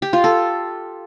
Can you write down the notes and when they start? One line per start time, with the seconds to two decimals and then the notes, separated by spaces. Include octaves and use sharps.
0.02 G4
0.13 F4
0.24 A4